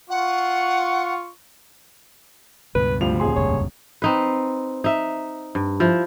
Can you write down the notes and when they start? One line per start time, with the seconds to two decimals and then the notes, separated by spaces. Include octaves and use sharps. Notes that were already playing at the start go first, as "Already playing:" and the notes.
0.10 F4 F#5 C#6
2.75 C#2 G2 B2 B4
3.01 D2 F3 G3 F7
3.20 D#1 G#4 C6
3.36 F1 C#2 G2 C#5
4.02 C4 D#4 B4
4.84 D#4 E5
5.55 G2
5.80 F3 E4